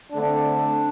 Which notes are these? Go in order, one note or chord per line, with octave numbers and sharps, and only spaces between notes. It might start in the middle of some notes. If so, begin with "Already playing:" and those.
D3 A3 C4 D4